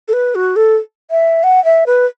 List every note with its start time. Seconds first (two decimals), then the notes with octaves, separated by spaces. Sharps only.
0.08 A4
0.13 B4
0.35 F#4
0.56 A4
1.11 E5
1.43 F#5
1.65 E5
1.86 B4